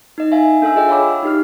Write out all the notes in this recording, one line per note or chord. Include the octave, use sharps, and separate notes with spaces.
D#4 D#5
E5 F5 G#5
D4 A4 E5 G#5 E6
F4 G#4 D#5 G5
C#5 F5 B5 D6 E6
D#4 G4 F6